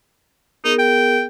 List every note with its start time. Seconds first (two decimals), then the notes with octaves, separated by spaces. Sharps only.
0.64 B3 D#4 G#4 A#4
0.79 G5